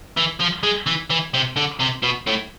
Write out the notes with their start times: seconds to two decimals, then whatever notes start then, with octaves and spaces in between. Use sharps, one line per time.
0.17 E3
0.40 F3
0.63 G#3
0.86 E3
1.10 E3
1.34 C3
1.57 D3
1.80 C3
2.03 B2
2.27 A2